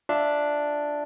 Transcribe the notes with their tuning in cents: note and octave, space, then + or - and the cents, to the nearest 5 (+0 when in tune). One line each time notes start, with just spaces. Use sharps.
D4 +0 F4 +0 E5 +0